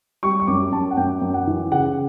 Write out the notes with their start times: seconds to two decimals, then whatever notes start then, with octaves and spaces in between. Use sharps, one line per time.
0.23 G3 C#6
0.40 C#6
0.47 F#2 D6
0.72 F#2 A5
0.91 F#5
0.97 F#2 G5
1.21 F#2
1.34 F#5
1.47 E3
1.72 C#3 F#5